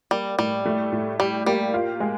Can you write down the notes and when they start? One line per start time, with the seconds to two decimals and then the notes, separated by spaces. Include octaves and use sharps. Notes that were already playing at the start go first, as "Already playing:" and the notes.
0.11 G3 A#3
0.39 A2 G3
0.65 A3
0.92 A2
1.19 G3 G4
1.46 G3 A#3
1.74 F4
2.00 G#3